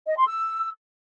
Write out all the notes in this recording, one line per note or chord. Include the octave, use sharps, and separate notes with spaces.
D#5
C6
E6